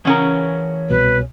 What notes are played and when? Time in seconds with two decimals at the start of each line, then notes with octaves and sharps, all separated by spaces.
0.05 C#3 E3 C#4 A#4 C#5 F#5
0.90 C2 B2 B4